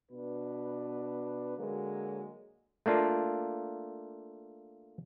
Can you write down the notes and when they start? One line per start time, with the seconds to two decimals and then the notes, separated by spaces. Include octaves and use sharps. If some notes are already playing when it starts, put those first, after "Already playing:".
0.12 B2 D4 B4
1.57 D3 F#3 G#3 A#3
2.86 A3 A#3 D4 F4